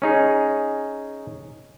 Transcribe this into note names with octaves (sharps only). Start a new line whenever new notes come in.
C#4 D#4 G#4